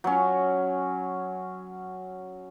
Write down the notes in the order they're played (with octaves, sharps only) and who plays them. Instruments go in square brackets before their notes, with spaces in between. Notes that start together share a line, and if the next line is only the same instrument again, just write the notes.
[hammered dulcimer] F#3 C#4